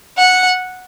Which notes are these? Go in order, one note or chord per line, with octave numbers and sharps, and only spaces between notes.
F#5